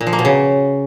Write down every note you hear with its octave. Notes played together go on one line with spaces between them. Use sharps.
A#2
F3
A#3
B2
C#3